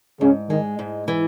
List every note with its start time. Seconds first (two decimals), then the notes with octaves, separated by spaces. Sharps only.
0.21 G#2 C#3 C#4
0.49 D#3 G#3 D#4
0.79 G#2
1.08 E3